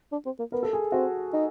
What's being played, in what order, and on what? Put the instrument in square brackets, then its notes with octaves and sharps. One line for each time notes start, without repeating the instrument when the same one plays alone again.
[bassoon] D4
C4
A#3
[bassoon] B3 [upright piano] A#4
[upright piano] A4
G#4
[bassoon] C4 [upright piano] F#4
[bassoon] D#4